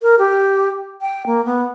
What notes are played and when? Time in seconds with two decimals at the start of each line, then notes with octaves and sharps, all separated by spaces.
0.02 A#4
0.19 G4
1.01 G5
1.26 A#3
1.45 B3